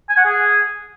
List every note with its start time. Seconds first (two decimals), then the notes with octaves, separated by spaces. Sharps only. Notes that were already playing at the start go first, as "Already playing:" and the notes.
0.09 G#5
0.17 F#5
0.25 G#4